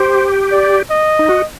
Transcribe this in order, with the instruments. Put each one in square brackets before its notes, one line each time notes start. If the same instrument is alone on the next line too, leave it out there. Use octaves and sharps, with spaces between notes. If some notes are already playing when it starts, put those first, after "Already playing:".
Already playing: [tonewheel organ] G4 [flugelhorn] C5
[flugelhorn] D5
D#5
[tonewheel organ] D#4
F#4